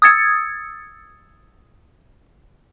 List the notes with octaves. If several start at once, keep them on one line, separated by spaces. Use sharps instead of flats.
D#6 E6 G#6 A6 C#7